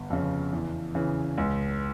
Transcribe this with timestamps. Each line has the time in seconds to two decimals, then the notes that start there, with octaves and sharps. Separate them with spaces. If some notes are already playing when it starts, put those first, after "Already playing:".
Already playing: G1
0.10 F2 C#3
0.53 E2
0.95 C#3 E3
1.38 C#2